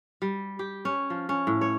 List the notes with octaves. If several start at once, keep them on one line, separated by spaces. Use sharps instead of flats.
G3
G4
C#4
F3
C#4
A2
C#5